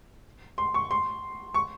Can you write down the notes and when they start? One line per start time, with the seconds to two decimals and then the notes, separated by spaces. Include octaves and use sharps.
0.58 C6
0.74 C#6
0.91 C6
1.54 C#6